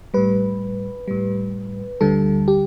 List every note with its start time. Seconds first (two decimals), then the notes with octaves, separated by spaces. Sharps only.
0.14 A2 G3 B4
1.08 A2 G3
2.01 D2 D3 G3 A4
2.48 G4